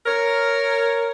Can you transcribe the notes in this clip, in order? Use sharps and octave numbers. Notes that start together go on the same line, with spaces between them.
A#4 C#5